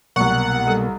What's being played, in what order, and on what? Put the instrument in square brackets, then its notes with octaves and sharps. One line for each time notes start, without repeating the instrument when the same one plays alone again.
[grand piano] C2 C#6 [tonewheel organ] B2 A#3 [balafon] F#3 [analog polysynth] F#5
[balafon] G3 A4